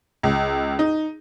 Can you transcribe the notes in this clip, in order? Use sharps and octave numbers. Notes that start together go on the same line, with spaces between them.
C#2
D#4